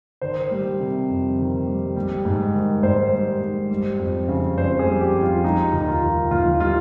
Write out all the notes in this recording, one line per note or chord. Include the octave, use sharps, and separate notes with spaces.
D#3 C5
G3
C3
F2
D#3
G3
G3
G#2
D#3
G#2 C5
G3
G#2
G3
F2
C#3
F2 C5
G#4
G3
G4
F2
F4
G3 D#4
D#2 D#4
F4
D#3
D#2 F4
G3 F4